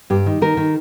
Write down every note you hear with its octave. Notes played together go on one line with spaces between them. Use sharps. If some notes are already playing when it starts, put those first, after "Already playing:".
G2 G4
D#3
D#3 A#4
D#3